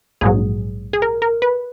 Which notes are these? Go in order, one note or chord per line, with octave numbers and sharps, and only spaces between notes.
A#1 G#2 F#3 G#4
G#4
A#4
A#4
B4